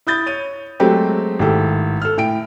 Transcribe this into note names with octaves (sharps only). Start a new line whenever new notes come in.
E4 D#6 G6 A6
C#5 D#7
F#3 G#3 A3 C4 F#4 G4
G#1 A2 G4 A4
A4 F6
A2 G5 D7